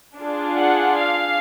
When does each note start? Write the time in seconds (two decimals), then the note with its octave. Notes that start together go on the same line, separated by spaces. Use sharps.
0.19 D4 F4 G#4
0.57 F#5
0.97 F5